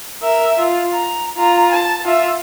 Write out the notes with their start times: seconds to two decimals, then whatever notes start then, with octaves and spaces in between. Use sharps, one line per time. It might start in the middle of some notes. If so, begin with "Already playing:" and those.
0.22 A#4 E5
0.59 F4
0.93 A#5
1.37 F4 A#5
1.72 A5
2.04 F4 E5